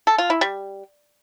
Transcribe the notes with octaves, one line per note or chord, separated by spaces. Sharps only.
A4
F4
E4
G3